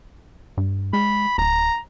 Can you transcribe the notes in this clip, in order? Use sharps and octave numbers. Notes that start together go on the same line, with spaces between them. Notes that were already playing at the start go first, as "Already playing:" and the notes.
G2
G#3 B5
D1 A#5